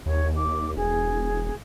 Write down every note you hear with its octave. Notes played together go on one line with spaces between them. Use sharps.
D#2 C#5
D6
E1 G#4